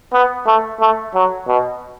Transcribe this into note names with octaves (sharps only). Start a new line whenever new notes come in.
B3
A3
A3
F#3
B2